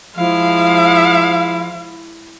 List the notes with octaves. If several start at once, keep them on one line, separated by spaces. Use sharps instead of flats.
F3 G#3 E4 F5